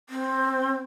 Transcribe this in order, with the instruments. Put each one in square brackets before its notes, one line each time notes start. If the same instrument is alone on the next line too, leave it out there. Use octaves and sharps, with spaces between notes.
[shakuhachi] C4